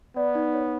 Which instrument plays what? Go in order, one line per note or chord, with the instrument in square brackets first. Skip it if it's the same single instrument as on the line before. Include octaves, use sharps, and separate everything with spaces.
[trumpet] B3 [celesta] D5
[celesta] D#4
C#5